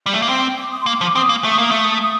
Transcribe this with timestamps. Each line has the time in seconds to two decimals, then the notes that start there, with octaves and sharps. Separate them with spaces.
0.06 G3
0.14 A3
0.22 A#3
0.29 C4 G5
0.58 D6
0.72 D#6
0.81 C6
0.86 A#3 D6
1.01 F3
1.15 C4 D#6
1.29 A#3
1.44 A3
1.58 A#3
1.71 A3
2.02 D#6